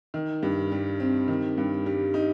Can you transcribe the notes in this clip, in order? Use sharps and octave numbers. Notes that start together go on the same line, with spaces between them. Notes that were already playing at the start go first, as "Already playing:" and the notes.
D#3
G2
G3
C4
D#3
G2
G3
D#4